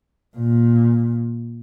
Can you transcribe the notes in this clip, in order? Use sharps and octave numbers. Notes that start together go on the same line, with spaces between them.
A#2